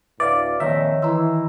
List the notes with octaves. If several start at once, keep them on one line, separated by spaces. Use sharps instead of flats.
D2 A2 B4 D5 E5 F5
F2 A#2 D#3 C#5 E5
E3 A#5 C6 E6